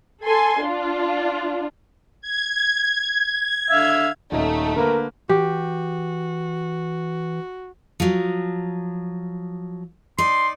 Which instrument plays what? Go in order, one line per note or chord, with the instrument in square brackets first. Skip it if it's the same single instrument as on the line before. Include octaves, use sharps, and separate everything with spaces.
[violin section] A4 G#5 C6
D4 F4
[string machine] G#6
[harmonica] D3 E5 F5
[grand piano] D#1 C#4 D#5 [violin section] A3 [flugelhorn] D#4
[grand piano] D3 A#3 B4 [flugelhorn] A#4
[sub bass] E3 [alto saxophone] F#4 [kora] G4
[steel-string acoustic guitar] F3 F#3
[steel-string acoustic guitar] D#4 D5 [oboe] C6